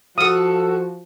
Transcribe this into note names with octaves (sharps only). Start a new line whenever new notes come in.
F3 F#4 A4 F5 D#6